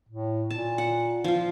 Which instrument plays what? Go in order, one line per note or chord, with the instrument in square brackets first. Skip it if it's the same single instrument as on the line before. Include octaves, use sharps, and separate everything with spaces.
[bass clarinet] A2
[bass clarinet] A#2 [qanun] A5
[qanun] F#5
F3 F4